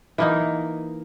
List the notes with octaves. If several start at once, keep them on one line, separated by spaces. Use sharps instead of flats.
E3 A#3 D#4